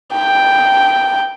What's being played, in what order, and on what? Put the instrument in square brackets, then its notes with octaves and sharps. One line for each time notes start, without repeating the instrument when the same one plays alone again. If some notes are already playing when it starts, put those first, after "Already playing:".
[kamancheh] G5